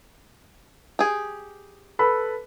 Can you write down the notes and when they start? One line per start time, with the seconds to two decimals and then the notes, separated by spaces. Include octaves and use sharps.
0.99 G4 G#4
1.99 A4 B4 B5